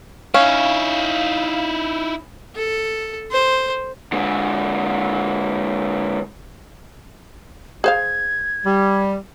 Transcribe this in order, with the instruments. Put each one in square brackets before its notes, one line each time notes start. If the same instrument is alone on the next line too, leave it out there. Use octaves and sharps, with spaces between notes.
[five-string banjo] C#4 [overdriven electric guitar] D#4 E4 [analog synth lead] F5
[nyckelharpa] A4
C5
[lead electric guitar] D3 G#3
[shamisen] G#4 C5 F5 [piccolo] G#6
[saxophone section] G3